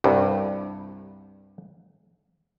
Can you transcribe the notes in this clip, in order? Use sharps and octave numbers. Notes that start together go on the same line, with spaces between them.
C2 G2